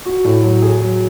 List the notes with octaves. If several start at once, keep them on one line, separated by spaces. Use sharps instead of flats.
F#4
A2
F#3
G#4
F#3